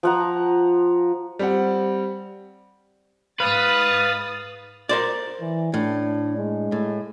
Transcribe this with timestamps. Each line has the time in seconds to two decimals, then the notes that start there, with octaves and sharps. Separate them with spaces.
0.03 F3 F#5 A#5
1.39 G3 C4 F#5
3.40 G#2 B4 F5 D#6 A6
4.89 A#4 C5 D5
5.41 E3
5.74 A2 D4
6.37 G#3
6.72 A2